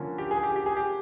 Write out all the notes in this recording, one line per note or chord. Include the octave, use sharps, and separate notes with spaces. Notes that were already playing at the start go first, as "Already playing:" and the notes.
Already playing: D3 F3 A#3 C#4
G4
G#4
G4
G4
G#4
G4